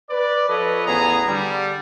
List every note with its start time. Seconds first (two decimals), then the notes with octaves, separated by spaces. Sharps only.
0.10 B4 D5
0.48 F3 A4 B4 C#5 D#5
0.87 A1 E2 B3 G#4 A#5
1.27 D3 G3